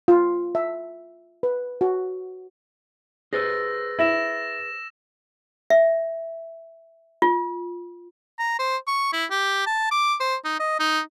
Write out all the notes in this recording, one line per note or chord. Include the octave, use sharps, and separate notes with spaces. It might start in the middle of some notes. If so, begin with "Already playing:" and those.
F4
E5
B4
F#4
G#4 B4 C5 E6 A6 A#6
E4 E6 A#6 E7
E5
F4
A#5
C5
C#6
E4
G4
A5
D6
C5
D#4
D#5
D#4